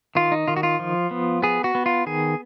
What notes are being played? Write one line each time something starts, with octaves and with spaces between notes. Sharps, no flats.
D#3 F4
D#4
D#3 F4
F#4
F4
F3
B3
B3 G#4
F#4
B3
F4
D#3 G#4